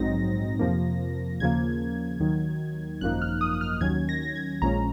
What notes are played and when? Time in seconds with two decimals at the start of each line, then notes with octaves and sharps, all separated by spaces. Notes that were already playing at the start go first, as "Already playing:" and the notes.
Already playing: A#1 G#2 F#3 C4 D#4 A#6
0.59 F2 C3 F3 A#3
1.40 D#2 C#3 F3 A#3 G#6
2.20 D#2 D#3 F#3
3.01 G#1 F#2 F3 A#3 D#4 F#6
3.22 F6
3.41 D#6
3.53 D#6
3.61 F6
3.81 D#2 D#3 F#3 C#4 G#6
4.09 A#6
4.23 A#6
4.36 G#6
4.62 A#1 A#2 F3 G#3 C#4 A#5